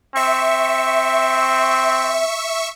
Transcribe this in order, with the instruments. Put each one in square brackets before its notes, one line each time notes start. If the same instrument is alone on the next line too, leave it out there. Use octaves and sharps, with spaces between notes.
[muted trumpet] C4 [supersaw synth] E5 C#6